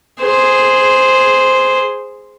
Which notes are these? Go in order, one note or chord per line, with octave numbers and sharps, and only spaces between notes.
G#4 C5